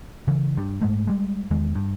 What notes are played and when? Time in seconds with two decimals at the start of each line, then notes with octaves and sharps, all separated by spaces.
0.28 C#3 E3
0.57 G2
0.82 G#2 G#3 A3
1.07 G3 G#3
1.51 E2 D#3 G#3
1.75 G2